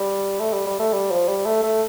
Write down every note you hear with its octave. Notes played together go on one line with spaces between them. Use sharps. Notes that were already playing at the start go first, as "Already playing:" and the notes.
Already playing: G3
A3
G3
G3
A3
G3
F3
G3
A3
A3